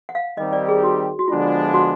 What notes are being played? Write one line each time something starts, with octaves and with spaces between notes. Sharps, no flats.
F#5
F5
D#3 G3 C4 D#4 G4 D#5
D5
G#4
F#4
F#4
D3 F3 G#3 B3 D4 F4
F#4